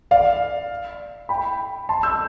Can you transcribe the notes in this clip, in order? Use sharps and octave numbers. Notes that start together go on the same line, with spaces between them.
D5 F5
G5 B5
A5 C6
E6 G6